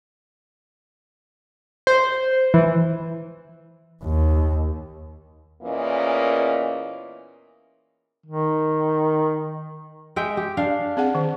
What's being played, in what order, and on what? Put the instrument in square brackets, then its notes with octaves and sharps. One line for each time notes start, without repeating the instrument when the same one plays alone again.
[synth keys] C5
E3
[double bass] D#2
[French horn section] E2 A#2 E3 A#3 C#4 D#5
[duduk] D#3
[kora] G#3 E5 G5
G4
D4 F5
[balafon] C4 G#4 F#5
D#3